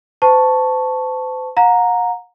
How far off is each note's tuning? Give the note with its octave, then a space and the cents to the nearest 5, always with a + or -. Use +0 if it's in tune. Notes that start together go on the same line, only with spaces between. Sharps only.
C5 -40 A5 +0 C#6 +0
F#5 -45 A#5 +0